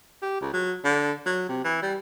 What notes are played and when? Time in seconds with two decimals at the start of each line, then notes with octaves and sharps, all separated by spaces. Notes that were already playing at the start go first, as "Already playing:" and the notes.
0.22 G4
0.41 C#2
0.53 F#3
0.84 D3
1.26 F#3
1.49 C3
1.64 E3
1.82 G3